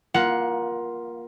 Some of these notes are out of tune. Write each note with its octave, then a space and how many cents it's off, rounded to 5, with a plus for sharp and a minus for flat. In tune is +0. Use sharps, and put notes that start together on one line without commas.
A#3 +20 F4 +0 F#5 +0